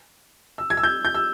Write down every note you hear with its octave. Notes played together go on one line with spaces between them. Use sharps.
E6
G#6
E6
G6
G6
E6